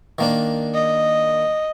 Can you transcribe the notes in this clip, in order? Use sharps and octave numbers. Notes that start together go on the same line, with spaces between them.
D#3 A#3 D4
D#5